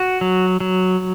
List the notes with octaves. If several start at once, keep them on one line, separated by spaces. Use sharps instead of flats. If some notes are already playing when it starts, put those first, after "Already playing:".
Already playing: F#4
F#3
F#3